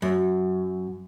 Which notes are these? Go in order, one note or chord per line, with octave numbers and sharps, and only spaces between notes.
F#2